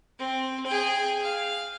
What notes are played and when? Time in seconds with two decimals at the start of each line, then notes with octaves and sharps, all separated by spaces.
0.19 C4
0.66 G#4 G5
1.21 F5